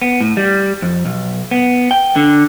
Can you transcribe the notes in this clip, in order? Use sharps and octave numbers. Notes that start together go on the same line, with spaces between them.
B3
A2
G3
F2
B1
B3
G5
D3